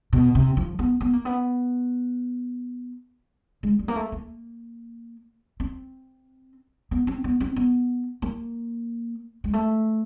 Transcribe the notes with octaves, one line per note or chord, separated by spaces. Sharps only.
B2
C3
F3
B3
B3
A#3
B3
G#3
G3
A#3
A3
A#3
C4
B3
C4
B3
C4
B3
A#3
G#3
A3